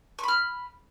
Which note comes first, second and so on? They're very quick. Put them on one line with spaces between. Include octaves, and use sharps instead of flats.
C#6 B5 F6